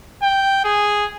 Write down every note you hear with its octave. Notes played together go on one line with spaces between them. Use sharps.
G5
G#4